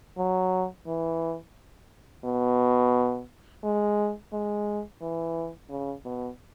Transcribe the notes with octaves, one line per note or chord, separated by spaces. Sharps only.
F#3
E3
B2
G#3
G#3
E3
C#3
B2